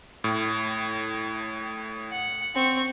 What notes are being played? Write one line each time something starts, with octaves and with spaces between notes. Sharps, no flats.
A2
F#5
C4 C#6